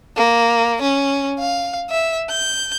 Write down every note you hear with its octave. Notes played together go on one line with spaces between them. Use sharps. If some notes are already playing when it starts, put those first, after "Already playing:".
A#3
C#4
F5
E5
G6